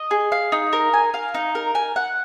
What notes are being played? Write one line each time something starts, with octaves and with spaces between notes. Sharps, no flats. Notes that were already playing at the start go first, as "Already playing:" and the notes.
Already playing: D#5
G#4
F5
D#4
A#4
G#5
F5
D#4
A#4
G#5
F#5